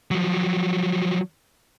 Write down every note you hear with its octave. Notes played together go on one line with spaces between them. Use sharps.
F3 F#3